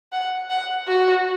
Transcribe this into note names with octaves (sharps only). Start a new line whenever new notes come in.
F#5
F#5
F#4